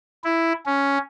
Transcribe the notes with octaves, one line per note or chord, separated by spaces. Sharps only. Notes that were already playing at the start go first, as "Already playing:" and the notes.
E4
C#4